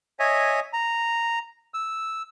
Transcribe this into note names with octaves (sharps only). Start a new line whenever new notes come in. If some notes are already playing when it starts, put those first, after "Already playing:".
C#5 D#5 E5 G#5
A#5
E6